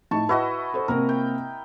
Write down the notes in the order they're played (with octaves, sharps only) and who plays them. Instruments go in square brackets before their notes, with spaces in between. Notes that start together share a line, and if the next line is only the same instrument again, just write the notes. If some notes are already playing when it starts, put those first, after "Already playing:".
[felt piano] A2 D#4 E4 [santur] A5 C#6
[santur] E4 F#4 D#5 [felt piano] B4
[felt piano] A4 C5
[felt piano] C3 A#3 C4 [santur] A#4
[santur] G5